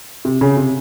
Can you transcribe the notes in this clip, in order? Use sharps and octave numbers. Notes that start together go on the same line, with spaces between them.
C3
C#3
C3